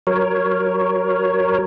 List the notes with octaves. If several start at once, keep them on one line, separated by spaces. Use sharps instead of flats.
F#3 A#4 C#5